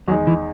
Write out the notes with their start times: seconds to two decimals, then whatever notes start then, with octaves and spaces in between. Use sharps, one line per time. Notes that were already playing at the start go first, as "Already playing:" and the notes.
0.08 E2 D#3 F#3 G#3 D#4
0.27 E3